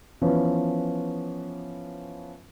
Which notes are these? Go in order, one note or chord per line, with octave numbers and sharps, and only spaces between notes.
E3 F3 B3 C#4